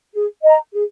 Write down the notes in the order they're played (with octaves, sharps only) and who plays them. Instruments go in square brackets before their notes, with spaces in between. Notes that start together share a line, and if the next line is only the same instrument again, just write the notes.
[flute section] G#4
D#5 A#5
G#4